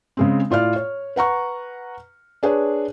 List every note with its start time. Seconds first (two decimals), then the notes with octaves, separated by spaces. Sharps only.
0.17 C#3 G#3 C4
0.50 A2 F4 D5 F6
0.76 C#5
1.16 B4 F#5 A#5 C#6
2.43 D4 G#4 B4 C#5